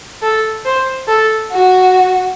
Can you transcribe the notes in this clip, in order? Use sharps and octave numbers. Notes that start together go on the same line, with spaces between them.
A4
C5
A4
F#4